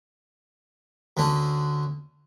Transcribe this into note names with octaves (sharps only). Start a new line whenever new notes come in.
D2 D3 C#4